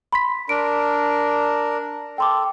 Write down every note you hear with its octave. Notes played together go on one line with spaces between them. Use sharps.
B5 C6 B6
D4 A#4 D7
A4 G5 C6 D6